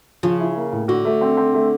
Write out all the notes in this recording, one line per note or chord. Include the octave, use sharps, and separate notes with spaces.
C#3 F3
E4
A#3
A2
D3 F#4
A3
C4
C4
A3